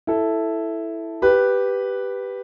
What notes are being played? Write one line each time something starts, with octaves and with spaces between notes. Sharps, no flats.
E4 A4
G4 B4